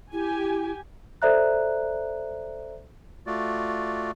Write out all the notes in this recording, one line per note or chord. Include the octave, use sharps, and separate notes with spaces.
E4 G4 G#5
A4 C5 D5 E5 A#5 F#6
A3 F4 F#4 D5